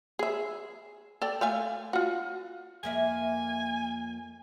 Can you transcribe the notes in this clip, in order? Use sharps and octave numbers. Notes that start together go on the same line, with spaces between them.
G#4 E5
A4 D5 G5
A3 F5 G#5
F4 F#4
F2 A#3 E5 G#5